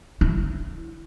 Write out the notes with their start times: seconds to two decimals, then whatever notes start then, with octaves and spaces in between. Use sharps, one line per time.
0.21 E4